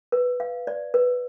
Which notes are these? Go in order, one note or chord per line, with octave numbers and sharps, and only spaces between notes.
B4
F5
D5
B4